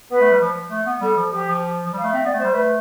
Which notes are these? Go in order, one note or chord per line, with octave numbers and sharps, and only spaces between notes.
B3 B4
A3
G3
F3
A3
B3
G3 A4
F3
F3 G4
F3
F3
G3
F5
A3
C4 E5
B3 D5
A3
G3 C5
A3 B4